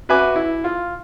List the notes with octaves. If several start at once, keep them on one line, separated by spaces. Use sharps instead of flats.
F#4 B4 E5 G#5 D6
E4
F4